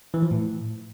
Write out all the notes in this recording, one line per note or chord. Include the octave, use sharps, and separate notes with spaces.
E3
F3
A2